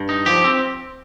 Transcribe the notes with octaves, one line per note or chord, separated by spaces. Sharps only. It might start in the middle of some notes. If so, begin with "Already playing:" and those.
Already playing: G2
D#4
F3 G4
C4